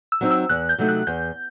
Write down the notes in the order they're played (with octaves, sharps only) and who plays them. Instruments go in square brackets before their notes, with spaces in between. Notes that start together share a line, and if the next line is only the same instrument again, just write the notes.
[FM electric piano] E6
[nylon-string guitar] F#3 C4 D#4
[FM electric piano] E6
[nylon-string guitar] E2 [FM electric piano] F#6
[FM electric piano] G6
[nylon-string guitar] C3 F#3 A3 D#4
[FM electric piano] F#6
[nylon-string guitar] E2 [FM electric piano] G6